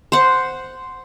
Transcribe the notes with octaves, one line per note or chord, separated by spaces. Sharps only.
C5 F#5